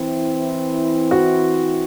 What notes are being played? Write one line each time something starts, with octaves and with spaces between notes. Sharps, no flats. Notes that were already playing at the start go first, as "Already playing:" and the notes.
Already playing: E3 C4 E4
F#4